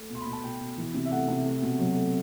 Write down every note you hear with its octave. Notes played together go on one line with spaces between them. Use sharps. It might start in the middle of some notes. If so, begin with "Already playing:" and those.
Already playing: A3
B2 C6
B5
B2
A5
B2 G5
B2
E3
C3
E5
A3 F#5
C3
A3
B2
F#3
A3